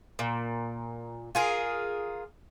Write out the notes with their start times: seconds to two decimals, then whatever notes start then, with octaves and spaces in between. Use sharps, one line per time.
0.19 A#2
1.35 F4 G#4 A#4